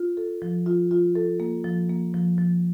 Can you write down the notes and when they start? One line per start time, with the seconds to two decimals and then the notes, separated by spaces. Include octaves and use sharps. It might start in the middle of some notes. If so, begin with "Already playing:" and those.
Already playing: F4
0.17 A4
0.42 F3
0.66 F4
0.91 F4
1.15 A4
1.40 A#3
1.64 F3
1.89 A#3
2.14 F3
2.38 F3